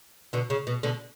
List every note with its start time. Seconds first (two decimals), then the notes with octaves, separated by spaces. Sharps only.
0.33 B2 D3
0.50 C#3
0.67 B2
0.83 B2 D3